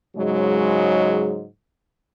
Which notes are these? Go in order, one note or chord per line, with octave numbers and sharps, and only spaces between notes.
G#2 C#3 F#3 G#3